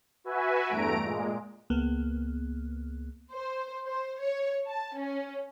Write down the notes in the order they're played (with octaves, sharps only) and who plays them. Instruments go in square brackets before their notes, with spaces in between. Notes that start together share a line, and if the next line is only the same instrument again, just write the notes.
[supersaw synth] F#4 B4 E5 G#5
E2 G2 A3 A#5 D7
A#2 G#3
[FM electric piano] C#2 A#3 B3
[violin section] C5
C5
C#5
A5
C#4